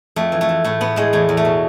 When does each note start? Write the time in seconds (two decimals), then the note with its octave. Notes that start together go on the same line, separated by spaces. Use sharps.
0.16 F2 A3
0.32 E3
0.41 A3
0.49 E3
0.64 A2 A3
0.81 A2 B3
0.96 A2 G#3
1.13 E2 A3
1.29 E2
1.37 A3
1.45 B2